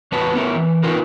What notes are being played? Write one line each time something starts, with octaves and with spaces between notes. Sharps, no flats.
E2 C#4 F#4 B4 A5
B3 C#4 E4 A#4
E3
B3 C#4 D#4 F4 A#4 B4